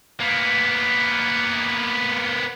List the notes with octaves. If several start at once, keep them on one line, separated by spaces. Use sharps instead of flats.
A#3 B3